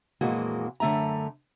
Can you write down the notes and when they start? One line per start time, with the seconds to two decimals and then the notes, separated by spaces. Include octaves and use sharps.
0.21 F2 A#2 E3 G#3 A#3 F#4
0.80 F#2 D3 A3 E5 A#5